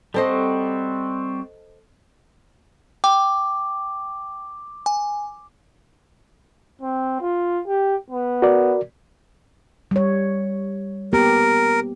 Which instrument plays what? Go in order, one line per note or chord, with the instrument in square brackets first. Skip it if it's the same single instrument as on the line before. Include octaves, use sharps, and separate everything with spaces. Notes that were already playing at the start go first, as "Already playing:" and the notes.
[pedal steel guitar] G3 C4 F#4 [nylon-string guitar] A4 C5 D#5
[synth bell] G5 [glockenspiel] D6
[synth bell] G#5
[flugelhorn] C4
F4
G4
B3
[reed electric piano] F#4 A#4 D5
[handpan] G3 C#5
[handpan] A#3 B3 G4 [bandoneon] A#4